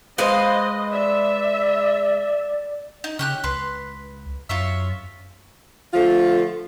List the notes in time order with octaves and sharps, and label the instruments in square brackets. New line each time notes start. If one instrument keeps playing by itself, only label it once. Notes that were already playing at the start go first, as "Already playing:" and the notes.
[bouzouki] G#3 B4 F5 [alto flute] C5 [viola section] D#5
[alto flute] D5 [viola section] E5
[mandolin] D#4
[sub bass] C#3 [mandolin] C#4 G4 F#6
[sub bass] C#2 [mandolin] B4 C6
[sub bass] F#2 [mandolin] F4 C#5 E5
[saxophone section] D3 F3 A3 F4